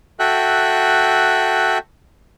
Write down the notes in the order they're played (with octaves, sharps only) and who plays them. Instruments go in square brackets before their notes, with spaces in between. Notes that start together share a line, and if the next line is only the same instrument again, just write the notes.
[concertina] F#4 A4 E5 G5 F#6